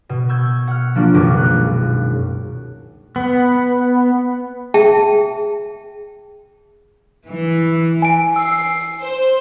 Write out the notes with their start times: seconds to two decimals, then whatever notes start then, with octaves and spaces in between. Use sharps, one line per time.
0.09 B2
0.29 C#6 E6 G6 G#6
0.68 F#5 F6
0.95 F3 A#3 D4 F4 F#4
1.13 D#1 C#2 F#2 B2 D6 A#6
1.37 F#6
3.16 B3
4.74 G#4 E5 G5 A5
7.28 E3
8.02 G#5 D7
8.36 E6 C7
9.01 C5